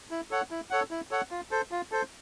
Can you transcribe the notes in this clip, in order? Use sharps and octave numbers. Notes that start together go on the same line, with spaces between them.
E4
A4 C#5 F#5
E4
A4 C#5 F#5
E4
A4 C#5 F#5
F4
A4 C5
F4
A4 C5